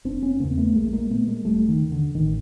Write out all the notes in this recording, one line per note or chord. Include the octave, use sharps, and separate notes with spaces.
F1 C4 D4
B3 C#4
E2 C#3 A#3 C4
A3 B3
A#1 G#3 A#3
A3
G#3 A#3
A#2 A3 B3
G#3 A#3
E1 G3 A3
D#3
D3
D#2
D3
A1 D#3